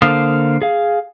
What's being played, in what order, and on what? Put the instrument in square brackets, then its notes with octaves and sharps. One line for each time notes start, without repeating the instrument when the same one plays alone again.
[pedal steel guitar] D3 A#3 C5 F5 D#6
G#4 F5